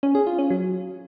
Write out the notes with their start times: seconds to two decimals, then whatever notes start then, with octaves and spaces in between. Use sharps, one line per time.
0.03 C#4
0.15 G#4
0.27 F4
0.39 C#4
0.50 F#3